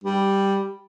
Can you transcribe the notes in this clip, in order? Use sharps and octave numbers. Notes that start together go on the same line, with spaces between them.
G3